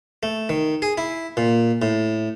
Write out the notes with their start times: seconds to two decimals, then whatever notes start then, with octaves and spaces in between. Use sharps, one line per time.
0.23 A3
0.49 D#3
0.82 G#4
0.98 E4
1.37 A#2
1.82 A2